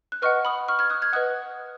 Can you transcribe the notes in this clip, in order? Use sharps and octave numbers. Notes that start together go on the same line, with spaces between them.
F#6
B4 D#5 F#5 C#6 F6
B5 D#6
C#6 F6
F6 G#6
D#6 F#6
F6 G#6
B4 D#5 F#5 D#6 F#6